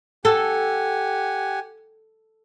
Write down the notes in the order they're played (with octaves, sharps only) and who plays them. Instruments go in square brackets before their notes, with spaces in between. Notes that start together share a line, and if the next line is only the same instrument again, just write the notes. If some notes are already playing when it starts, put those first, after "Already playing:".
[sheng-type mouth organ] G4 F#5 G#5 [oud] A4